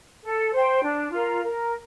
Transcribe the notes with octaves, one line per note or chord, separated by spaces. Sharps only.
A4
C5 G5
D4
F4 A#4 F5
A#4